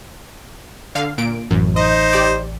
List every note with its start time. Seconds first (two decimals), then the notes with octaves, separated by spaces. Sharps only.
0.95 D3 F5
1.18 A#2 D7
1.51 A1 F#2
1.76 D#4 C5 D#5
2.13 G4 D5